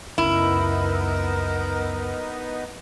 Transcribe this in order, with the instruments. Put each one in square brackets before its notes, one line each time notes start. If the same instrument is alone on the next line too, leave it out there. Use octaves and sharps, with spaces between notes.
[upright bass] C#2 F#2 [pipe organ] B3 D#4 [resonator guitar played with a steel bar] E4 [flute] A#4